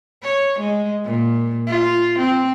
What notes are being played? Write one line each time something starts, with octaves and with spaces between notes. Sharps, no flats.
C#5
G#3
A#2
F4
C4